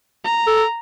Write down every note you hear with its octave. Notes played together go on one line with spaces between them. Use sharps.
A#5
A4